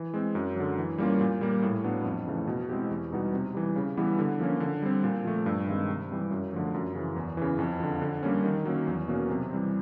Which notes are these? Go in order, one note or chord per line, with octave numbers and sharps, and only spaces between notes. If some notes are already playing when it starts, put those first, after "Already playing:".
Already playing: E3
G#3 C4
F#2
D3 F#3
E3
G3 A#3 C#4 F4
A#2
G3 A#3
A2
F#3 B3 D4
F2
C#3 E3 A3
B2
G#3 C4 E4 G4
E2
B2 G3 B3 D#4
C3
E3 G3
C#3
E3 G3 B3 E4
D3
F3 A#3 C#4
D3
G3 C4
A#2
F3 A3
G2
D#3 G#3 C4
C3
E3 G3 C4
F#2
D3 F3 A3
F#2
C#3 E3
E2
C#3 E3
F2
D3 F3
D3
G3 A#3 C#4
D#3
F#3 A#3 C#4
E2
B2 F#3 A#3 C#4
C3
E3 G3 C4